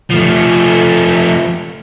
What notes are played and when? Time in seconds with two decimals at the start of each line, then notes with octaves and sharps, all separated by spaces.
0.10 F3 A3